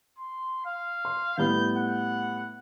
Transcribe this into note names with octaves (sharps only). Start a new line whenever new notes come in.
C6
F5
C6
A2 G3 B3 G6
F#5